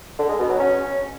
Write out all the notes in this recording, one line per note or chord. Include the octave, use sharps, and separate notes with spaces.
D3
G#3
B2
F#3
C#4